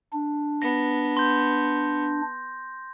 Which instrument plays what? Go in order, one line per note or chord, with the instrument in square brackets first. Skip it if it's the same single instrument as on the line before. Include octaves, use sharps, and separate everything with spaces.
[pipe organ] D4
[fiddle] B3 [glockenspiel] A#6
[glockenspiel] C6 G6